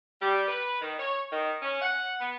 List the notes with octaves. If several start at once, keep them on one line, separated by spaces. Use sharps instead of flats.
G3
B4
D#3
C#5
D#3
C#4
F#5
B3